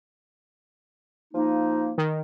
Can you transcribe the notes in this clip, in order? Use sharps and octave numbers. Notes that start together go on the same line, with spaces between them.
F3 A#3 D#4
D#3